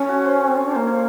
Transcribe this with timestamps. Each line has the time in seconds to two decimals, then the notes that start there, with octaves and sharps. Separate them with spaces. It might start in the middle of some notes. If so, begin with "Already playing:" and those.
Already playing: C#4 A4
0.09 F#4
0.25 C5
0.40 C#5
0.48 C4
0.55 C#4 C#5
0.66 D4
0.71 C5
0.77 A#3
0.87 C#5